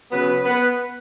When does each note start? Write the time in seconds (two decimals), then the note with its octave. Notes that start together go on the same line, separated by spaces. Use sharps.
0.11 C#3 F#3 B3 B4
0.43 B3 B4